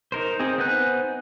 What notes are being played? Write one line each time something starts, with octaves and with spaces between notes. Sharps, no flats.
D#4 A#4 C5
C4 D#4 G#4
B3 D#4 C5 G#5 F#6